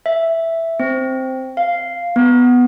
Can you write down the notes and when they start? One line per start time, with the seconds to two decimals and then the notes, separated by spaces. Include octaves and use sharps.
0.06 E5
0.80 C4
1.57 F5
2.16 B3